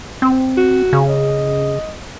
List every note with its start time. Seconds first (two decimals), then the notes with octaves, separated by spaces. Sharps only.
0.22 C4
0.57 F#4
0.93 C#3
1.09 D#5